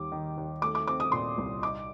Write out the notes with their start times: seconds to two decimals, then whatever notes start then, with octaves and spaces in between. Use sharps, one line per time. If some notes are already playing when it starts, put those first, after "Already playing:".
Already playing: D#2 G3 D6
0.12 D#3
0.37 D#2
0.62 A3 D6
0.75 D6
0.87 C4 D6
1.00 D#6
1.12 A#2 C6
1.38 C2
1.62 D#4 D6